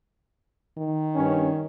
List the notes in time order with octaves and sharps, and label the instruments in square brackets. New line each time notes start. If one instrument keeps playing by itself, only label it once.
[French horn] D#3
[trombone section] G2 C#4